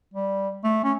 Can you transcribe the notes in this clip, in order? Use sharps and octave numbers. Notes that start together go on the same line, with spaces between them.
G3
A3
C#4